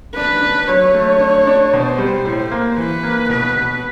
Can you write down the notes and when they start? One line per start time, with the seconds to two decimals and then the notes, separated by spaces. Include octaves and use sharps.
0.15 D4 B4
0.42 D4
0.68 F#3 C#5
0.94 A3
1.21 D4
1.47 D4
1.73 B2 C5
1.98 G3
2.25 A2
2.51 A#3
2.77 E3 B4
3.03 A#3
3.29 B2 B4
3.56 B2